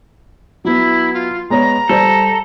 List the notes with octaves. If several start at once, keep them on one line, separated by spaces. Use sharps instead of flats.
F#3 B3 E4
F4
G#3 B3 C#5 A#5
G3 A4 C5 D5